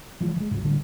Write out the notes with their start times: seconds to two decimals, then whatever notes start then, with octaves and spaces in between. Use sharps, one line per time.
0.20 E3 F3 G#3
0.36 F3 G#3
0.51 B1 F2 G#2
0.64 A2 D3 G3